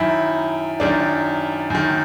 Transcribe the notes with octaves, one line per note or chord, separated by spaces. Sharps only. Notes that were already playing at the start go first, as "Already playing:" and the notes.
Already playing: F#2 D#3 E4
F#2 D#3 D4
F#2 D#3